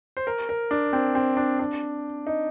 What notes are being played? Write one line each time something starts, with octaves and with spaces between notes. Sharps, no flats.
C5
A#4
A#4
D4
C4
C4
D4
D4
D#4